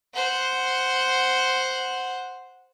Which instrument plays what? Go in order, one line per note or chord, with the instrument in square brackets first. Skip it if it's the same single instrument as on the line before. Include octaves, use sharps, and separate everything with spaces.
[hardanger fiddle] C5 F#5